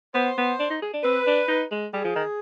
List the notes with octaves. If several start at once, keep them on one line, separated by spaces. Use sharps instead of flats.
B3 C5
B3
D4
D#4
G#4
D4
C4 B4
D4
D#4
G#3
G3 G#4
F3
D#3